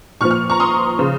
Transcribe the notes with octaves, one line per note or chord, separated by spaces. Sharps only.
A#2 F3 C#6 F6
C#6 F6
A#5 C#6
C6 D#6
C#3 F3